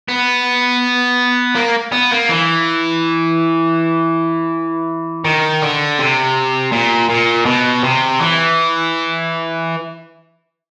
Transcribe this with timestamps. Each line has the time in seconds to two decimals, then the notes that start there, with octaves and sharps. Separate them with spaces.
0.08 B3
1.55 A#3
1.92 B3
2.11 A#3
2.29 E3
5.25 D#3
5.62 D3
5.99 C3
6.72 A#2
7.10 A#2
7.46 B2
7.84 C3
8.20 E3